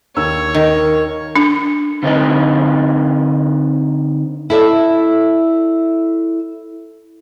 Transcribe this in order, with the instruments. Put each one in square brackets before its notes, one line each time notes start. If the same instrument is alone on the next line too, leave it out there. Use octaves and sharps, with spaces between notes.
[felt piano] D#2 E6 [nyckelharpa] C#5
[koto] D#3 [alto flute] A#4
[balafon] D4
[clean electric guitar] D3 C4 D#4 B4 D#5
[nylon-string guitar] E4 A4 D5 E5